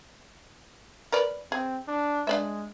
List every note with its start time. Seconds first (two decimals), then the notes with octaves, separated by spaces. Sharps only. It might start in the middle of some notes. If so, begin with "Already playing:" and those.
1.12 A#4 B4 D5
1.52 C4 G#4
1.88 D4
2.27 G#3 D4 D5 E5